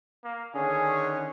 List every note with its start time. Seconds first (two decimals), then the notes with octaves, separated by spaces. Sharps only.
0.24 A#3
0.55 D3 D#3 C#4 G#4